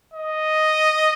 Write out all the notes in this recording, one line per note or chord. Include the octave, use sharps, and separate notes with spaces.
D#5